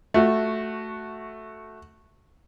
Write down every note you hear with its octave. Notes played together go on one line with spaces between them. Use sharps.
A3 F#4